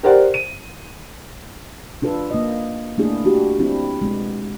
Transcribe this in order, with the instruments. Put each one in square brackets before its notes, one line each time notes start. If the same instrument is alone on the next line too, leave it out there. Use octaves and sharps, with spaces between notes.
[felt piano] G4 A#4 C5 D5 F#5
D#7
[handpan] D4 F4 A4 B4
A#3 D#5
A3 A#3 D4 E4 G#4
D4 F#4 G4
F#3 C4 D4 E4
G#3 B3